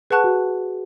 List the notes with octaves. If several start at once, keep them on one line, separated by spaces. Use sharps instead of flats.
G#4 B4 F#5 A5 C#6 F#6
F#4